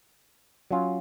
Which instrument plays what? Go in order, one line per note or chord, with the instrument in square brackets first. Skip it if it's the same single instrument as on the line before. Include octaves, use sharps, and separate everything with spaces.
[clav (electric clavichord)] F#3 C#4 F4